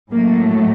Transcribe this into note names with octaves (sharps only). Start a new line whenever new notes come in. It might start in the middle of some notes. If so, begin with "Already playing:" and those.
A2 F#3 A3 A#3